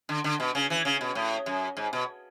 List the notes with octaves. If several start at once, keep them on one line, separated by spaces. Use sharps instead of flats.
D3
D3
B2
C#3
E3
C#3
B2
A2
F#2
G#2
B2